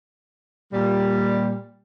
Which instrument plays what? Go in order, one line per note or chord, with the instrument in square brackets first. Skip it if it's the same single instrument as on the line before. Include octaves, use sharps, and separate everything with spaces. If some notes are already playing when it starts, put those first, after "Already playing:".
[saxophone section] A#2 G3